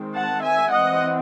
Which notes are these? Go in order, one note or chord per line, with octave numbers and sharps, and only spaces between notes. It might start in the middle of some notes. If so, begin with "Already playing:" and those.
Already playing: D#3 G#3 C4
F#5 A5
E5 G#5
E3 C4 D#5 F#5